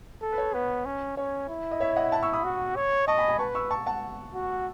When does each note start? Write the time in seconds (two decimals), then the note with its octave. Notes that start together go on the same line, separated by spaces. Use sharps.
0.22 A4
0.32 B4
0.38 C#5
0.54 B3 B4
0.85 C#4
1.17 C#4 C#5
1.49 E4
1.71 D#5
1.80 C#5 E5
1.96 D#5 F#5
2.12 F#5 A5
2.23 C#6 E6
2.33 B5 D#6
2.44 F#4
2.76 C#5
3.07 D#5 A5 C#6
3.18 G#5 B5
3.29 G#5 B5
3.39 B4 A5 C#6
3.55 C#6 E6
3.71 A5 C#6
3.86 F#5 A5
4.34 F#4